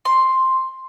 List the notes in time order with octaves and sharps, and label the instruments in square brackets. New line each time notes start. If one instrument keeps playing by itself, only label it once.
[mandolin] C6